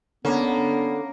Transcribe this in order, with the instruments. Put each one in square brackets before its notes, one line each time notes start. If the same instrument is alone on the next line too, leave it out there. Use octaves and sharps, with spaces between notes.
[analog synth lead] D3 [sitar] A#3 [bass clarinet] B3 [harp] C#4